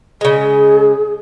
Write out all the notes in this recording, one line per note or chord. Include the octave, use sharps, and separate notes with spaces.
C#3 G#3 G#4